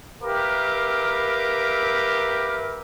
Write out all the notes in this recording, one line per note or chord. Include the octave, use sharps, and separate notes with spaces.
G4 A#4 B4 E5 F5 D6